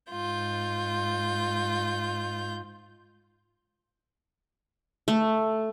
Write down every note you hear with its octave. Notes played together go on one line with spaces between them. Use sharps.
G#2 F4 G6
A3